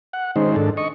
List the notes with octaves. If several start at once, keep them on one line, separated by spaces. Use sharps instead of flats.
F#5
D#3 G#3 C#4 D#4 C5
G#2 D#3 D4 A4
D#5 C#6